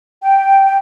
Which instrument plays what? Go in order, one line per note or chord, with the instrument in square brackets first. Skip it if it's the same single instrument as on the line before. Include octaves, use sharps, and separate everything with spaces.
[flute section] G5